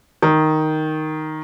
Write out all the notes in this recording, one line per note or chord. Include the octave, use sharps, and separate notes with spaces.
D#3